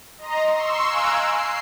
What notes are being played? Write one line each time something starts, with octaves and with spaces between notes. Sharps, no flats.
D#5 A#5 C6
C6 C#6 E6
F5 G#5 A#5 E6 F#6 D7
C7